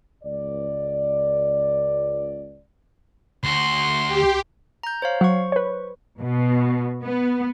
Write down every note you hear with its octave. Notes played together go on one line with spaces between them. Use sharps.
C#2 D5
D2 F#4 C6
G4
A#5 G6
C5 C#5 F5
F#3 C5 C#6
B4 C#5
B2
B3